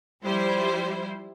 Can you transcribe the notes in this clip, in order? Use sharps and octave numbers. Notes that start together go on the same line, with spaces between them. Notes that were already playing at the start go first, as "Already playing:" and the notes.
F3 G3 E4 C5